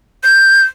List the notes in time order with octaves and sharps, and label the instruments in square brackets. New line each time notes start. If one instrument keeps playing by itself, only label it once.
[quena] G6